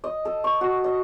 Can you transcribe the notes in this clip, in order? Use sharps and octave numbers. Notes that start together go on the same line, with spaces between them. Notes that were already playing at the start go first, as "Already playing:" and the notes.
D#5
A4
C#6
F#4
D#5